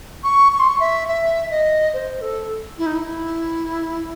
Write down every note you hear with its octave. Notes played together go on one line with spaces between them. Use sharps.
C#6
C#6
C6
C#6
E5
E5
D#5
C5
A4
E4
D#4
E4